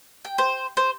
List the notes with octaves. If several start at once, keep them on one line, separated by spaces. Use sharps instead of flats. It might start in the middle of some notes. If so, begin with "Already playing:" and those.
G5
C5
C5